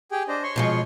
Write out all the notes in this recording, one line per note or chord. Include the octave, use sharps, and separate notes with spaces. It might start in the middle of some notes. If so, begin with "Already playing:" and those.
G4 G#4 G5
D4 C5 D#5
C#5 C6 C#6
B2 F3 G#3